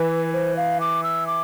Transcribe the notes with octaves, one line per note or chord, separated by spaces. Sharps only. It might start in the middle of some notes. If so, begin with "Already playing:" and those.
Already playing: E3 B4
C5
F5
D6
E6
D6